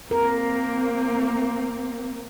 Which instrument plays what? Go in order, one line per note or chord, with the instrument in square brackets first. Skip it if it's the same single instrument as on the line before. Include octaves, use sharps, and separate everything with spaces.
[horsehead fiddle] A#3 C4 [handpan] A#4